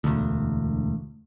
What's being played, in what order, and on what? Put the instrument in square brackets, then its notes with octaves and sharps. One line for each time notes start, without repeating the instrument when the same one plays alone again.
[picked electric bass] E1 D2